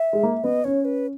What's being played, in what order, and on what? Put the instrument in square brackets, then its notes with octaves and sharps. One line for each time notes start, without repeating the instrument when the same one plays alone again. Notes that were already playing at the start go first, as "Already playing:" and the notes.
Already playing: [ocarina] E5
[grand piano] G#3
A#3
[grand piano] B3 [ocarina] D#5
[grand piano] C#4 [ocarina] C#5
[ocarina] B4